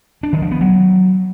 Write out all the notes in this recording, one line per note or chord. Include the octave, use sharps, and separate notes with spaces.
D4
D#3
F3
B3
F#3